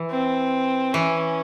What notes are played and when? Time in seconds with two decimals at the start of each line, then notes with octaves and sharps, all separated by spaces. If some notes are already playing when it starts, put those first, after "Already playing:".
Already playing: E3
0.11 C4
0.93 E3 C#4